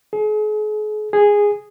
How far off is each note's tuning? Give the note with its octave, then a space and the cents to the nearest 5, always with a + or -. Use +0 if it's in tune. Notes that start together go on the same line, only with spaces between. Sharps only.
G#4 +40
G#4 -10